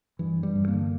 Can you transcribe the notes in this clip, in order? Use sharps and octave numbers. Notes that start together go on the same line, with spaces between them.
G2 E3
G2
G3
G2
A#3
D3